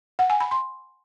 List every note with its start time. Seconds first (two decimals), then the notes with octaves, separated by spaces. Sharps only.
0.19 F#5
0.30 G#5
0.40 B5
0.51 C6